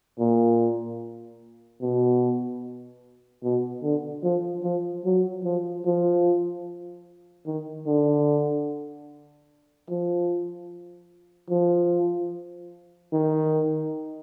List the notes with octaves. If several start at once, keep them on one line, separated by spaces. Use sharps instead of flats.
A#2
B2
B2
D3
F3
F3
F#3
F3
F3
D#3
D3
F3
F3
D#3